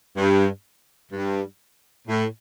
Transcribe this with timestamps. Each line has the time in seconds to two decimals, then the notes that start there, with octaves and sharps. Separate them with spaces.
0.17 G2
1.12 G2
2.08 A2